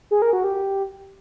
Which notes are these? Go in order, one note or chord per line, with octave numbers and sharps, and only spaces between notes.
G#4
A#4
F#4
G4